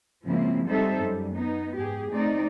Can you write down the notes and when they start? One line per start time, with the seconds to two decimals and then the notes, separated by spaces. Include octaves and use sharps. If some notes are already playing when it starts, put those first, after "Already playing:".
0.25 G#2 C#3 F3 A#3 C4 E4
0.66 G3 C4 D#4 A4 C5 E5
1.01 F#2 G3
1.34 B3 D#4
1.74 G#2 G4 G#4
2.11 A3 C4 D#4 D5